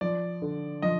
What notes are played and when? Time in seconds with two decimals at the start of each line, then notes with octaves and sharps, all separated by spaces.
0.01 F3 D5
0.42 D3
0.82 F3 D#5